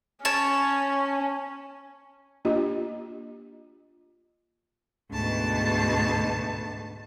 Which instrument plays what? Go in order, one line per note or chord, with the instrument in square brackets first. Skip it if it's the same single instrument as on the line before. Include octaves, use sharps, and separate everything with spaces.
[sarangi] C#4 [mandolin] C#5 A5
[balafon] A#3 D4 F4 G4 D#5
[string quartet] D2 G#2 B2 A5